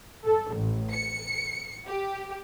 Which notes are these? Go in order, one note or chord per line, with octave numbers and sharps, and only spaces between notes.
A4
A1
C#7
G4